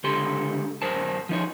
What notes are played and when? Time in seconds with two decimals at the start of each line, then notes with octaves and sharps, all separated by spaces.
0.04 C#2 D3 G4 A4 C6
0.82 F#2 A#4 C5 A5
1.29 F3 D#4 C#5